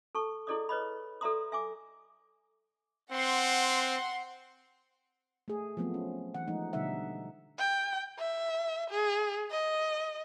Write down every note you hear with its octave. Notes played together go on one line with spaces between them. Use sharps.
A4 A5 C#6
E4 G#4 A4 D5 D#5 D#6
B4 C#5 D#5 B5
A4 D5 E5 A#5 C6 D#6
E5 G#5 D6
C4 F#5 C6
A3 G#4
F3 F#3 A3 B3 C4
C#4
E3 F#5
F3 G#3 A3 D#4
B2 D3 G3 D#4 E5 F#5
G5
E5
G#4
D#5